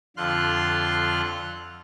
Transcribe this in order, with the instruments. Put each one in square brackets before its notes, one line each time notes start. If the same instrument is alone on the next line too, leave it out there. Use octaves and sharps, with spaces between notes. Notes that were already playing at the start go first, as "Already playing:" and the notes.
[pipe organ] F2 D3 F4 C6 F6 F#6